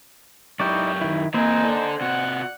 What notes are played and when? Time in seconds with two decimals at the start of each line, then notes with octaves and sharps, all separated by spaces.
0.60 F#2 D#4 E4 G4 D5 C#6 G6
1.01 D#3 E4
1.34 E3 A#3 C4 D#4 C5 G#5
1.64 D4 A4 D5
2.01 C3 F#4 F#5